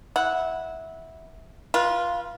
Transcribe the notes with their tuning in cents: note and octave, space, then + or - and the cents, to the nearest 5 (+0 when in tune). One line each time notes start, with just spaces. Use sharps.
E4 -20 F#5 -10
F4 +0 B4 -35